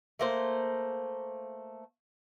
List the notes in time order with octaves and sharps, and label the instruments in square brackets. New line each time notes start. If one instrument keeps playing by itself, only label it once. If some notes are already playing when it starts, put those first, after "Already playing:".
[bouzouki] A3 A#3 C5